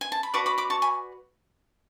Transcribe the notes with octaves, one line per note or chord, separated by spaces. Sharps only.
G#5
A5
B5
F#4 B4 D5 A5 C#6
B5 D6
B5 D6
A5 C#6
G#5 B5